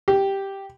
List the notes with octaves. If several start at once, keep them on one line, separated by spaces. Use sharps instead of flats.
G4